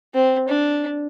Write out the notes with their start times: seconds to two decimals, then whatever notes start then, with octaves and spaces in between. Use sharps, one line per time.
0.14 C4
0.48 D4